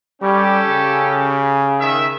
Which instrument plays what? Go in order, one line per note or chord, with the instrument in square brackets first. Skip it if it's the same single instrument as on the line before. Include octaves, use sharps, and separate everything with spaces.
[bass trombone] G3 [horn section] C#4 G4 A4
[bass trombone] C#3
[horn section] D#3 E5